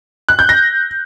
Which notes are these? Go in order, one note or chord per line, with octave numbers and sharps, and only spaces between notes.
F#6
G6
A#6